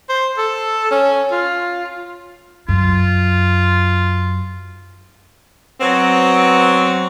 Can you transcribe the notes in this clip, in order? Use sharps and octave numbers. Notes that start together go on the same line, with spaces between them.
C5
A4
C#4
F4
F#2 F4
F#3 B3 C4